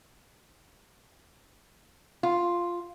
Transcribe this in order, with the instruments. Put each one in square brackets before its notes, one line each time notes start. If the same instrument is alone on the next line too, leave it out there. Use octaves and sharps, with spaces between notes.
[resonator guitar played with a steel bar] F4